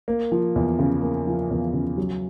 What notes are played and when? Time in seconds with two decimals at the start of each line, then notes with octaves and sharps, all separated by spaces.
0.08 A#3
0.32 F3
0.56 E2
0.79 C#3
1.02 A#3
1.27 F3
1.50 E2
1.73 C#3
1.98 F#3